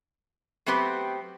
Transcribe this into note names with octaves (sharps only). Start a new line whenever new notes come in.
F#3 A3 B3 C4 G4 B4